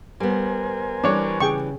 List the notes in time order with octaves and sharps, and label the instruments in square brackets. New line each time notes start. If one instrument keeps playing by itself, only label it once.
[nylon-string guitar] G3 B3 [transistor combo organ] A#4 C5 G#5
[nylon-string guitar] E3 G3 [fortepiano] D4 C#5
[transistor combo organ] C#3 [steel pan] G#4 G5 C#6